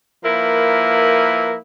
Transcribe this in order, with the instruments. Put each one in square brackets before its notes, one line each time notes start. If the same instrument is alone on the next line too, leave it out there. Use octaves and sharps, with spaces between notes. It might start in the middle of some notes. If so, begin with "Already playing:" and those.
[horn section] F3 A#3 E4 A#4 B4